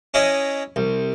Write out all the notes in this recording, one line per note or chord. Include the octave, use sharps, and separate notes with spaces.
C#4 E4 C#5 D#5
C2